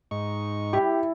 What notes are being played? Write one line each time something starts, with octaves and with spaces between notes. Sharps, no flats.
G#2 D#4 C#6
G3 E4 G4